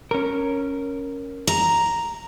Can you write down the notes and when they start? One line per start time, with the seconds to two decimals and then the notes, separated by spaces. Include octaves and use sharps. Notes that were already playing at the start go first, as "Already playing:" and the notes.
0.11 C#4 A#4
1.47 A#5